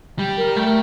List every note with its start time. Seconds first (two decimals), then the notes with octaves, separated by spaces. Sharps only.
0.19 G3 G5
0.37 A#4
0.56 A3 G5